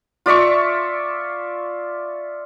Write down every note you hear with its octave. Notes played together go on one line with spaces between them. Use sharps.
F4 D5 E5 C#6